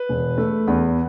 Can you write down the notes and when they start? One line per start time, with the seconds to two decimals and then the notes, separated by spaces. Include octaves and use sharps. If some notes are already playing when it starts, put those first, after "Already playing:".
Already playing: B4
0.09 E1
0.38 A3
0.68 E2